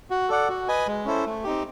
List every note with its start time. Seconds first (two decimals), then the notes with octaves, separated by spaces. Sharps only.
0.10 F#4
0.29 A4 D5 F#5
0.49 F#4
0.68 B4 D#5 G#5
0.87 G#3
1.05 C#4 E4 A4 C5
1.25 A3
1.44 C4 D#4 G4